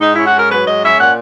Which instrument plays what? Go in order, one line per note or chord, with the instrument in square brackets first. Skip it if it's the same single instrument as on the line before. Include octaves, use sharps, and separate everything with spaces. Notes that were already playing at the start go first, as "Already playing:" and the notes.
[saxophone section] G#2 D#4
C#4 E4
F#4
G#2 A#4
F#3 B4
G#2 D#5
C#4 E5
A#2 F#5